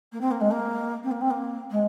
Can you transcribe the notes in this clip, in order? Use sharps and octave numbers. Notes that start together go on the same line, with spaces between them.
A#3
C4
A#3
G#3
A#3
C4
A#3
C4
A#3
G#3